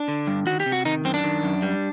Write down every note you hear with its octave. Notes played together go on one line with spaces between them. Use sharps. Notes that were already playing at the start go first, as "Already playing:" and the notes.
Already playing: D4
D3
G2
D#3 F#4
G4
C3
F#4
D#3 D#4
F#2 C4
D4
D#3
F#2
G3